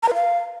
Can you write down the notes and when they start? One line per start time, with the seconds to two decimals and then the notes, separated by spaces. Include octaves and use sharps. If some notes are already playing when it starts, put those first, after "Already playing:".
0.03 A#5
0.09 B4
0.14 F5